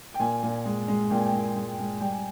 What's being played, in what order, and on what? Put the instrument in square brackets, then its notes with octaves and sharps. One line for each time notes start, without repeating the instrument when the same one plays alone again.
[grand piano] G5
A#2 G#5
A#2
G#3
G#3
A#2 G5
G#5
G5
A#2
G#3
G#3
G3 G5
G#5